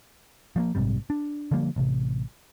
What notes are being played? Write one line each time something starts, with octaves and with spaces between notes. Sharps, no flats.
F3 A3 A#3
A#1 G#2 C3 G3
D4
D3 F3 G3 A#3
A1 C3